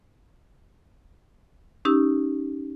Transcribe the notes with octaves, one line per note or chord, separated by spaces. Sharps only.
C#4 D#4 G4 E6